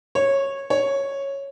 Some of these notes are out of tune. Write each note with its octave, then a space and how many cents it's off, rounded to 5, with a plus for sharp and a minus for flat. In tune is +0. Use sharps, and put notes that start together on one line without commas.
C#5 -15
C#5 -5